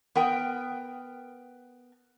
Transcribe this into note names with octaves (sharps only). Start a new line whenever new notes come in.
B3 A#4 G5